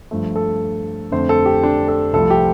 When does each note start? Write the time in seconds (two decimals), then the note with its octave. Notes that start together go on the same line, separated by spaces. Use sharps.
0.11 G2 F3 A3
0.36 A4
1.12 F2 D3 A3 C5
1.29 A4
1.46 G4
1.63 D4
1.88 A4
2.13 C2 C3 F3 A3 A4
2.30 G4